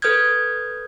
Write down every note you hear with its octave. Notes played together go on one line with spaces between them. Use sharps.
A4 B4 D#6 F6 G6 G#6